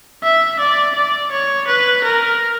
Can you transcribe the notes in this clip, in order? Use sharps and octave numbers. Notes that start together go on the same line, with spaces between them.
E5
D5
D5
C#5
B4
A#4